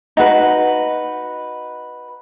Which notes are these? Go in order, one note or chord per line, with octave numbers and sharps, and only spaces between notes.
D#4 F#4 B4